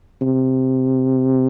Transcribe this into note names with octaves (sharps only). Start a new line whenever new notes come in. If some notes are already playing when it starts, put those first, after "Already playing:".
C3